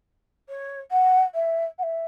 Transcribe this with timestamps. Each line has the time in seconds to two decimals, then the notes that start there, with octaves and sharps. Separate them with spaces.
0.49 C#5
0.91 F#5
1.34 E5
1.78 F#5
1.83 E5